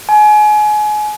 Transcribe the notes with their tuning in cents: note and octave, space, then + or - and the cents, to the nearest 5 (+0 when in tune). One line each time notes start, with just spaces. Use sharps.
G#5 +30